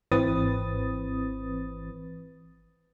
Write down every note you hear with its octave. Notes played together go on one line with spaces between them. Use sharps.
G#1 E3 C4 B4 D#6 A6